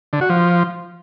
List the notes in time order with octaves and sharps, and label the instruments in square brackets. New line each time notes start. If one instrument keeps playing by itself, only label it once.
[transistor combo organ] D3
F#4
F3